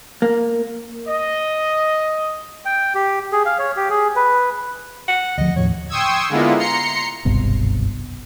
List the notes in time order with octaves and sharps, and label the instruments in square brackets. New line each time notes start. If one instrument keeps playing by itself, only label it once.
[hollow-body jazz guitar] A#3
[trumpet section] D#5
[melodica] G5
G4
G#4
F5
C#5
G4
G#4
B4
[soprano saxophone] F#5
[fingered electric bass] D2 F3 [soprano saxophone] D#5
[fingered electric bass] D#2 A2 F3 [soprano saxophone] C#5
[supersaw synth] G5 C6 C#6 D#6 E6 G#6
D3 G#3 A#3 B3 E4 F4
A#5 C6 C7 C#7
[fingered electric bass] F#1 C2 G2 B2